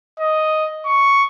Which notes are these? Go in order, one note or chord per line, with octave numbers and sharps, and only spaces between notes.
D#5
C#6